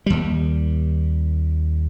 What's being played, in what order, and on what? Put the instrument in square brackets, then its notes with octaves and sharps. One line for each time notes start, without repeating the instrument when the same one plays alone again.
[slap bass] D#2 G3